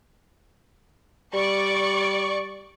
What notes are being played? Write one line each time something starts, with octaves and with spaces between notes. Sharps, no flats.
G3 D5 C#6